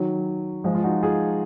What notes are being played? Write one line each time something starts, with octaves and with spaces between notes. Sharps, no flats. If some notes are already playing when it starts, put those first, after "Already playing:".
Already playing: D#3 F#3
F3 G#3
F4
D#4 F#4
F4 G#4